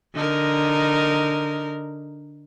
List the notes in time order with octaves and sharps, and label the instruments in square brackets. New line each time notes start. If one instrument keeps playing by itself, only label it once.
[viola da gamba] D3 D#4 A#4